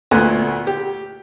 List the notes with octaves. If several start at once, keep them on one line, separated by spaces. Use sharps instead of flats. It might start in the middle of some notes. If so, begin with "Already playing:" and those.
D2 A#2 A3 B3 G#5 F#6
G4